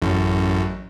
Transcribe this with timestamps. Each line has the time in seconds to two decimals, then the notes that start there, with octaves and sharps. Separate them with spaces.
0.02 A1 F#2